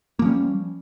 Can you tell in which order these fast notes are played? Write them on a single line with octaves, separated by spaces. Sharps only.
A#3 F3 C#4 G3